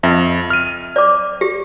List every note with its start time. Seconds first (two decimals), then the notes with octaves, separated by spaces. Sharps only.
0.03 F2 E5
0.50 F6 D#7
0.96 D5 D6
1.41 G4